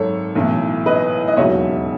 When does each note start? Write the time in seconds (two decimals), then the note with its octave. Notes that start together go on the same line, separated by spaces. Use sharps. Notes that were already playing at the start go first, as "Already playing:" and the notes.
Already playing: G#1 F#2 A4 C#5
0.35 B1 A2 E3
0.86 B4 D#5
1.28 D#5
1.37 E1 D#2 C#3 F#3 C#5 E5